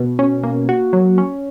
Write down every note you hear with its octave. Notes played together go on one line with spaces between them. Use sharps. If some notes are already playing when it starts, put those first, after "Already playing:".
Already playing: B2
C#4
A#3
F#4
F#3
C#4